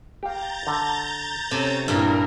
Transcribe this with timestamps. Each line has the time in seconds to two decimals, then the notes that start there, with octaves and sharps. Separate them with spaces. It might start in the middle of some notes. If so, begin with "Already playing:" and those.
0.23 G4 F5 A#5 G6 A6
0.67 D3
1.51 C3 C#4 A4
1.88 G2 A#2 E4 A#4